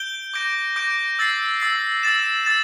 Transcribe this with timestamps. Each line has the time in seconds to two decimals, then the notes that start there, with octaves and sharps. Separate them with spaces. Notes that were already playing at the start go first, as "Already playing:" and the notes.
Already playing: G6 D7 G7
0.34 D6 G6 A#6 D7
0.76 D6 G6 A#6 D7
1.19 E6 A6 C7
1.60 E6 A6 C7
2.03 E6 A6 E7
2.45 E6 A6 E7